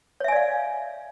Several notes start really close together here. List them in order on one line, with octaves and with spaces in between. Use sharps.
C#5 E5 G#5 D5 F5